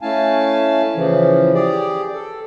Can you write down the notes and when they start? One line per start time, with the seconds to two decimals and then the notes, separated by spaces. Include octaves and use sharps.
0.02 A3 C#4 E4 F5 G#5 A5
0.96 C#3 E3 F3
1.54 G4 G#4 D5
2.14 A4